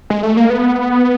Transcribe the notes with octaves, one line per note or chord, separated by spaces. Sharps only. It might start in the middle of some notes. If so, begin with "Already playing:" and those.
G#3
A3
A#3
B3